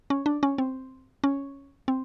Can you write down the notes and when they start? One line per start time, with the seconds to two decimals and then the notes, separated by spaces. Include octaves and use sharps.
0.10 C#4
0.26 D4
0.43 C#4
0.58 C4
1.24 C#4
1.88 C4